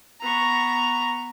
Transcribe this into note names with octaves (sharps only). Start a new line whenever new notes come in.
B3 A#5 C#6